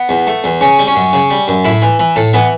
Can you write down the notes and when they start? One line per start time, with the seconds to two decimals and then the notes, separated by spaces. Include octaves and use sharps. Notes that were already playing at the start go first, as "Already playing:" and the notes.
Already playing: B3
0.09 E2
0.27 A3
0.44 E2
0.61 C#3 C#4
0.79 G3
0.87 C#4
0.96 F#2
1.13 C#3
1.30 G3
1.48 F#2
1.65 A2 E4
1.82 E3
1.99 E3
2.16 A2 A4
2.33 E3 B3